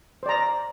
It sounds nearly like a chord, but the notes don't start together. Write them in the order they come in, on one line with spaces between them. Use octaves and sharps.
C5 D5 A#5